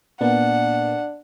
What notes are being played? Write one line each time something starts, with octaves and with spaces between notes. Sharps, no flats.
A#2 A#3 B3 D4 F#5